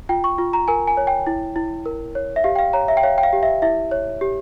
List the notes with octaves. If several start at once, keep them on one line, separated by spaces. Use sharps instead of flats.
F4 G5
C#6
F4
A#5
A#4 G#5
G#5
C#5
G5
E4
E4
A#4
C#5
E5
G4 F5
G5
F5
C#5 A#5
E5
G5
C#5 F5
G5
F5
G4
E5
E4 E5
C#5
G4